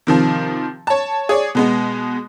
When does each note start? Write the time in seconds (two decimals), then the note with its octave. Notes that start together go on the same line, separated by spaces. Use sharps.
0.07 C3 D#3 F3
0.87 C#5 A5
1.29 G#4 C#5 D5
1.55 B2 G#3 B3